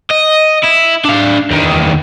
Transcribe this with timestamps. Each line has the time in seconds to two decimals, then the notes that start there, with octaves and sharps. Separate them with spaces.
0.11 D#5
0.64 E4
1.05 D4 F5
1.51 E2 D#3